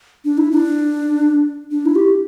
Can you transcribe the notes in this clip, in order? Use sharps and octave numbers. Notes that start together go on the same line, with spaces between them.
D4
E4
D4
D4
E4
G4